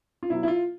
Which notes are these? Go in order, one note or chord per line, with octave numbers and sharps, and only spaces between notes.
F4
B2 F#3 E4
E4
F4